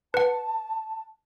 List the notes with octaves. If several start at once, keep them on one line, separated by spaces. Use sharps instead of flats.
B4 F#5 A5